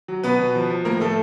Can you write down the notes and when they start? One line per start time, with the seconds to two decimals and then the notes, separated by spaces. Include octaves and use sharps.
0.08 F#3
0.23 B2 B3 B4
0.39 B2
0.55 F3
0.70 F3
0.85 A2 A#3 A#4
1.00 F3 A3 A4